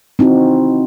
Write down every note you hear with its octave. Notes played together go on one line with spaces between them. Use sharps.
C4 D#4 E4 F#4